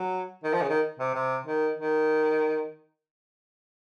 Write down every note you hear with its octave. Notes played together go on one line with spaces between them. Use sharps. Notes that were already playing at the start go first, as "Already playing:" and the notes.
Already playing: F#3
D#3
F3
C#3
D#3
C3
C3
D#3
D#3